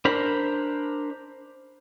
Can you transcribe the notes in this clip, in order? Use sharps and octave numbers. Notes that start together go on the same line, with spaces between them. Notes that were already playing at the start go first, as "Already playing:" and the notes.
D4 A#4 C5 B5